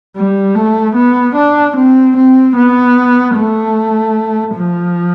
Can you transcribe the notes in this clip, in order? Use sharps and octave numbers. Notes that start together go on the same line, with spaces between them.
G3
A3
B3
D4
C4
C4
B3
A3
F3